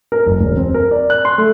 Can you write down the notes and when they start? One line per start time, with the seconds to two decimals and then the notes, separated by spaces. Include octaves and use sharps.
0.12 A#4
0.26 F#1
0.40 E1
0.57 C4
0.74 A#4
0.91 D5
1.10 F#6
1.25 C6
1.38 A3